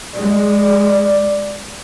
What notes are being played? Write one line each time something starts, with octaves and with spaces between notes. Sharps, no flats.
G#3 D5